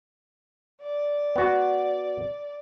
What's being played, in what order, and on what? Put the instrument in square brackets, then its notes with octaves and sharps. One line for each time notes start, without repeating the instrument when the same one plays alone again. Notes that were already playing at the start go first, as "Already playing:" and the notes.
[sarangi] D5
[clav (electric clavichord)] B3 F#4